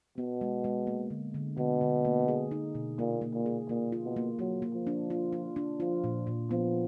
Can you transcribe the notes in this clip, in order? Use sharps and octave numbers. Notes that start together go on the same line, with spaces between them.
B2 B3
G#3
G#3
A#3
D3
D3
B2 D3
D3
A#3
G#4
D#4
B2
A#2 A#3
A#3
A#2
G#4
A#2 A#3
F4
B2
A#3
F#3 A#3
A#3
F3
D4
F4
F4
D4
F3 F4
A#2
A#2
F3 B3